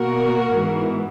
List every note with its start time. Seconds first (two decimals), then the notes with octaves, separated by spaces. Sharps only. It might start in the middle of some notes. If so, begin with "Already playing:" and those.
Already playing: B2 A#3 F#4 A#4
0.55 G#2 E3 B3